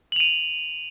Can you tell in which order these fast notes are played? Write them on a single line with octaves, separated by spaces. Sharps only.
F#7 F7 D#7